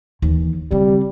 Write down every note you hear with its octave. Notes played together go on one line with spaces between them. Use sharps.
D#2 E3
C#3 G3 C4